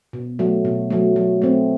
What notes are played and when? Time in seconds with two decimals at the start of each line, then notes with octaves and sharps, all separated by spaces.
0.13 B2
0.39 F#3 A3
0.65 B2
0.90 F#3 A3
1.16 F#3
1.42 A3 C4